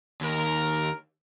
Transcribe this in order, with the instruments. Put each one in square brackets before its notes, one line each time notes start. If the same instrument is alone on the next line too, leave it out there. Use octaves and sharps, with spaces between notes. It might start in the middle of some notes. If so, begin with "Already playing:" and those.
[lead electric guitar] D#2 [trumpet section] A#4